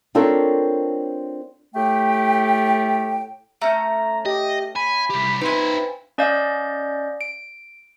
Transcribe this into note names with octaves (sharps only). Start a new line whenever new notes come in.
C4 D4 F4 A4 A#4 C#5
A2 A3 G4 G5
A3 C#4 A#5 G6
G4 D#5
G#5 B5
C2 G4
C4 D#4 F4 B4 E5 G#5
C#4 D5 D#5 F5 G6
D7